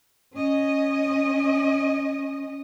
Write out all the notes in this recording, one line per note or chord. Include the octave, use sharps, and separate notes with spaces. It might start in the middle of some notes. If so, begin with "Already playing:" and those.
C#4 D#5